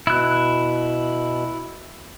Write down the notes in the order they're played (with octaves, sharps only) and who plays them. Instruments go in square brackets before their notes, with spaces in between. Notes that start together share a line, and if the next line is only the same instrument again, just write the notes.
[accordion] B2 [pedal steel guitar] E4 F#6